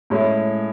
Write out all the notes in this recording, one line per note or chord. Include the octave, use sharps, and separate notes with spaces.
A2 G#3 C#4 E4